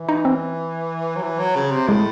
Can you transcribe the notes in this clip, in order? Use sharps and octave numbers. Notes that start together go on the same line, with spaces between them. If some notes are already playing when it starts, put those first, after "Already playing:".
Already playing: E3
D#4
C4
F#3
E3
F#3
C#3
C3
A2 G#3